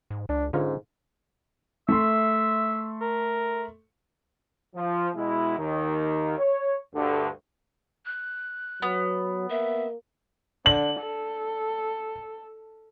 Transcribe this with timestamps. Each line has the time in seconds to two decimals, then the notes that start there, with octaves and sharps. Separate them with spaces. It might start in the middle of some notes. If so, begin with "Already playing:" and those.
0.10 G#2
0.29 C#2 D4
0.53 G#2 D3 C#4 F4 A#4
1.89 A3 E5 C6
3.01 A#4
4.75 F3
5.16 B2 G#3 E4
5.58 D#2 D#3
6.38 C#5
6.95 D2 G2 D3
8.05 F#6
8.82 F#3 B3
9.50 A#3 E5
10.66 D3 F#7
11.01 A4